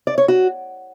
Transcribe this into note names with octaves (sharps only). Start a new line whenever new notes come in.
D5
C#5
F#4